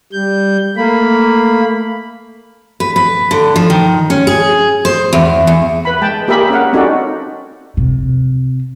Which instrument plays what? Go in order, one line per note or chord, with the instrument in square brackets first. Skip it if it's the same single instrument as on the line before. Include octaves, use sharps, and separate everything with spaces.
[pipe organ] G3 G6
[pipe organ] A3 B5 [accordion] A#3
[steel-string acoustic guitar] B4
B4
D3
F3
D#3
C#4
G#4
C5
E2
E2
[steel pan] B4 B5
G#3 G5 A5
A#3 G4 G#4 A#4 E5 B5
C#4 A#4 F5 F#5
C4 C#4 D#4 F#4 A4 D5
[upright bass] C3